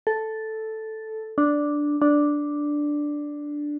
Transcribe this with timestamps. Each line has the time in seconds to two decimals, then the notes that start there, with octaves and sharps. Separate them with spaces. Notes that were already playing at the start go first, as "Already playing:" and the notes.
0.07 A4
1.38 D4
2.02 D4